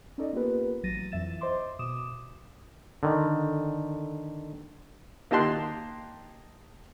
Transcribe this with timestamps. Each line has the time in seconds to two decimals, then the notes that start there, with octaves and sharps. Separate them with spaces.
0.18 C#4 D#4 A4 D5 D#5
0.33 A#3 B3 F4 G4 A#4 B4
0.83 A1 F#3 A6 A#6 D#7
1.12 F2 E3 E5 A6 E7
1.41 C5 D#5 E5 C6 D6
1.79 B2 D6 D#6 E7
3.03 D3 D#3
5.31 A#3 D#4 G4 A5 C6 F#6